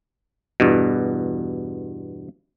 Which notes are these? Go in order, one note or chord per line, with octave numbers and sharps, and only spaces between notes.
E2 G2 B2